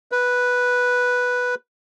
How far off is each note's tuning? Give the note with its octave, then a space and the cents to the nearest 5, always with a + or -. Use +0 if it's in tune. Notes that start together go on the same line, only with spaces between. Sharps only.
B4 -5